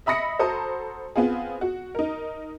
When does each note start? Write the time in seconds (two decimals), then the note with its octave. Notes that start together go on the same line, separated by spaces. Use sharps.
0.06 D#5 E5 B5 D#6 A#6 C#7
0.39 F#4 A4 C5 A#5 B5 D#6
1.16 B3 C4 F4 G#4
1.61 F#4
1.95 D#4 A#4